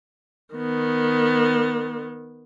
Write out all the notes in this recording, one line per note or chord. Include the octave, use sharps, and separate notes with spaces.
D#3 B3